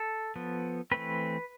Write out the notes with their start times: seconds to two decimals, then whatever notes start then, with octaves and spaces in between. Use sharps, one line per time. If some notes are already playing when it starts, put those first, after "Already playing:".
Already playing: A4
0.36 F3 B3
0.92 E3 A3 C4 B4